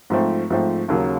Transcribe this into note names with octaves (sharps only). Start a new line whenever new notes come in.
G#2 F3 A3 C4
G#2 F3 A3 C4
D#2 C#3 F#3 A#3